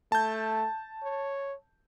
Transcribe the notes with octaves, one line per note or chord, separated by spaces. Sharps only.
A3 A5 G6
C#5